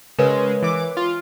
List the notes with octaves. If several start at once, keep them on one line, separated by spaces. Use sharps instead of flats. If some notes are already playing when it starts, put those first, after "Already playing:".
C#3 G#3 A#4 B4 C#5
E3 D6
F4